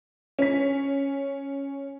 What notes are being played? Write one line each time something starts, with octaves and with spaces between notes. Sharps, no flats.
C#4 B6